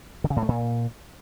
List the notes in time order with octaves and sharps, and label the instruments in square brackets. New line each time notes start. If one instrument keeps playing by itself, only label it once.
[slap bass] D3
C#3
A2
A3
A#2